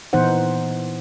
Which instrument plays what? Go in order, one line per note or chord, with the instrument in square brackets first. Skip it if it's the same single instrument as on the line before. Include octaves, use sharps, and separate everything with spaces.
[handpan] A#2 E3 B3 D#4 C5 F#5